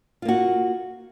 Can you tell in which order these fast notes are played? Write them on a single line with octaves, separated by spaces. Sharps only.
F4 A#3 F#4